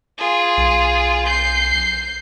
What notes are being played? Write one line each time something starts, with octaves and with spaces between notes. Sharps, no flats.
F4 G#4
B1
G6 C7